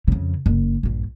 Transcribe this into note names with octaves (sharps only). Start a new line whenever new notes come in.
F2 C#3
F#1
A#1 G2